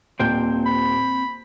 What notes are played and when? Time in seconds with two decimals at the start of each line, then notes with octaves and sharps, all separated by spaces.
0.19 D#1 A#2 C4 C5 G5 G6
0.66 B5